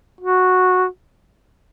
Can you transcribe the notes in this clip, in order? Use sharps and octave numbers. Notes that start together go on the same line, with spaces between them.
F#4